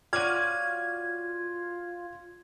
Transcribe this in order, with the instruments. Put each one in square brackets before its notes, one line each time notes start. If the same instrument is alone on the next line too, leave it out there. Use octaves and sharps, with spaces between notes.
[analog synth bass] F4 [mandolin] F#4 C#5 D5 [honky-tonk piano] F6 D#7 [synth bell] G#6